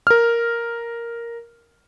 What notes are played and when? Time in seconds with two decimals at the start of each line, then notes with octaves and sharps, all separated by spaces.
0.07 A#4 F6